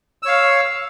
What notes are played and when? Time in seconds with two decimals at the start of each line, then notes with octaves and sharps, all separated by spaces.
0.23 E6
0.25 C#5
0.28 F5